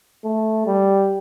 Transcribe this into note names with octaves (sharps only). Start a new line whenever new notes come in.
A3
G3